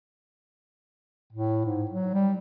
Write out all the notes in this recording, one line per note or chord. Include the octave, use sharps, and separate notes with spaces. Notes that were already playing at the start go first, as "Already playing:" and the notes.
A2
G#2
F#3
G3